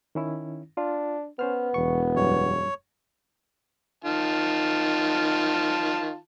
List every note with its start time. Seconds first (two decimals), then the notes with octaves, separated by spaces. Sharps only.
0.15 D#3 C#4 E4
0.77 D4 F4
1.39 B3 C#4 C5 F6
1.74 E1 E2 C#6
2.16 F#2 G3 E4 C#5
4.04 D#3 F4 A5